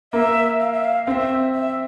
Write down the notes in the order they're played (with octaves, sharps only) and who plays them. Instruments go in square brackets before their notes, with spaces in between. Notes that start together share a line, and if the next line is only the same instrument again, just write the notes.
[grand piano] A#3 [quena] E5
[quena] F5
E5
F5
[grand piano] C4 [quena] E5 F5
[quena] E5